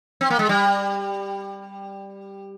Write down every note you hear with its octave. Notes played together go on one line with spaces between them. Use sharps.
C4
A#3
G#3
G3